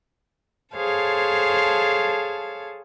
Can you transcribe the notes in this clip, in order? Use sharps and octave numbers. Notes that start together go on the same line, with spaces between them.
G#4 A4 C5 C#5 F5 A5